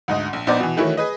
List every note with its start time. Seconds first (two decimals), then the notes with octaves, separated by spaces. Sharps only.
0.08 D2 G#2 D#5
0.33 A#1
0.47 A#1 B3 D#4 C5 D5 D6
0.60 B2 E3
0.77 D#3 E3 A3 E4 F#4 C#5
0.97 G#4 B4 D#5